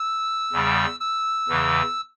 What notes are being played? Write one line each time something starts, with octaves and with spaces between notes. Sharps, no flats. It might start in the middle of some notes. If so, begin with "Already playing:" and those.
Already playing: E6
E2 C#3 G3
E6
E2 C#3 E3